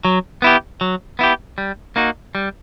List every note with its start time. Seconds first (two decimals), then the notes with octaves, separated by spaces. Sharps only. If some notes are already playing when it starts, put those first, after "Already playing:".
0.05 F#3
0.42 B3 E4 G4
0.81 F#3
1.19 B3 E4 G4
1.58 G3
1.96 A#3 D#4 F#4
2.35 G3